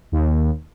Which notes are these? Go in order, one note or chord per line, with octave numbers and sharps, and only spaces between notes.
D#2